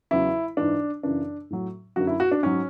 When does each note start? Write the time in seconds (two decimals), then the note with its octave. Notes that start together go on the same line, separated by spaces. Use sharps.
0.11 E2 C#3 F#3 E4
0.57 G#2 E3 D4
1.03 F#2 C#3 E3 D4
1.50 A2 F#3
1.96 F#2 D3 F#3 F#4
2.07 E4
2.20 F#4
2.31 D4
2.43 G#2 F#3 C#4